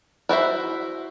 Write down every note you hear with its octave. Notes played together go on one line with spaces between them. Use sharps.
E4 F#4 C5 E5